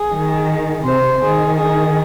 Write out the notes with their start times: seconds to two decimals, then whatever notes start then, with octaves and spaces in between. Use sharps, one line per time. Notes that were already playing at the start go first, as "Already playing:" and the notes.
Already playing: G#4
0.10 D#3
0.85 C3 C5
1.22 D#3 G#4
1.60 G#4